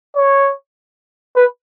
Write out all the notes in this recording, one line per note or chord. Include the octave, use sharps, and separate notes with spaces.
C#5
B4